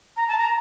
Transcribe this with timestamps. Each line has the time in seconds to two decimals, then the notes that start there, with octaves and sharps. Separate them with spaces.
0.16 A#5
0.28 A5
0.38 A#5